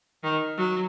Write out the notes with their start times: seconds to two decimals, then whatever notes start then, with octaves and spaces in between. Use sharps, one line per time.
0.24 D#3
0.57 F#3